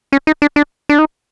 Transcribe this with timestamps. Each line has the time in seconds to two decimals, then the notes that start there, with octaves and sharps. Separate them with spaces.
0.12 C#4
0.27 D#4
0.42 D4
0.56 D4
0.89 D4
0.99 D#4